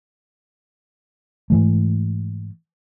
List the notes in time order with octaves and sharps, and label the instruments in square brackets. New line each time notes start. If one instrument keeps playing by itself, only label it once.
[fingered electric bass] G#2 E3 A3